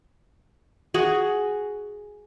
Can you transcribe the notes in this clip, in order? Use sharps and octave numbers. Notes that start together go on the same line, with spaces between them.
F#4 G#4